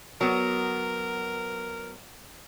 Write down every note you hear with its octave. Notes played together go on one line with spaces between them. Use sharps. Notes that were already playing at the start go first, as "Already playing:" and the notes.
F#3 B3 A#4